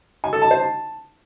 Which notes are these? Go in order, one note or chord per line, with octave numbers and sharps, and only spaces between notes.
G#5
A4
A5
C5
A5